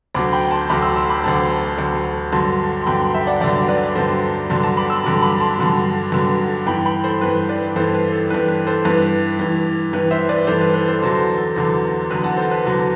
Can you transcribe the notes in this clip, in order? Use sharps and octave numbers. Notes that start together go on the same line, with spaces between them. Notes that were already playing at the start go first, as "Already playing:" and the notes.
D2 D3 F#3 B5 D6
G5 B5
A5 C6
D2 D3 F#3 B5 D6
C6 E6
C6 E6
B5 D6
D2 D3 F#3 A5 C6
D2 D3 F#3
G2 D3 F#3 A5 C6
C6
G2 D3 F#3 G5 B5
E5 G5
D5 F#5
G2 D3 F#3 D5 F#5
B4 D5
G2 D3 F#3 A4 C5
G2 D3 F#3 A5 C6
A5 C6
B5 D6
C6 E6
G2 D3 F#3 B5 D6
B5 D6
A5 C6
G2 D3 F#3
G2 D3 F#3
G2 E3 G5 B5
G5 B5
A4 C5
G2 E3 B4
B4 D5
G2 E3 A4 C5
B4
A4
G2 E3 B4
B4
A4 C5
G2 E3 B4
G2 E3
G2 E3 B4
C5 E5
B4 D5
G2 E3 A4 C5
B4
B4
A4 C5
E2 D3 F#3 A4 C5
A4
E2 D3 F#3
E2 D3 F#3 B4
F#5 A5
A4 C5
B4
E2 D3 F#3